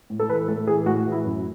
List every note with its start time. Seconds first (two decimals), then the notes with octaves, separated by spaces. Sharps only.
0.10 A2
0.19 A4
0.29 E3 B4
0.48 A2 A4
0.67 E3 G#4
0.86 A2 F#4
1.06 E3
1.12 E4
1.25 F#2